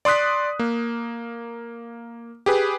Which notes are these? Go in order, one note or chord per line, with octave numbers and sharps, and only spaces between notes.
D5 C6 D#6 F#6 B6
A#3
G4 G#4 B4